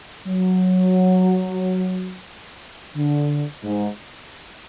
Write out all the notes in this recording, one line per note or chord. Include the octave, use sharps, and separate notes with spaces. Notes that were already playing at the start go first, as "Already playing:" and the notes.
F#3
D3
G#2